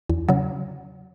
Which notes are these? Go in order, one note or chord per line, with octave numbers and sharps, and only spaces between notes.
E2
C#3 F#3